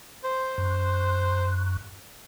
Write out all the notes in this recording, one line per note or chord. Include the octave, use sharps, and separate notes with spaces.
C5
F#2